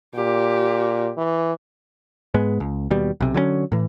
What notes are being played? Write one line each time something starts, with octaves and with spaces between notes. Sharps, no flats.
A#2 G4
E3
G#2 G#3 B3
C#2
D#2 B2 G3
B1 C3
D3 F#3 G3 C#4
A2 E3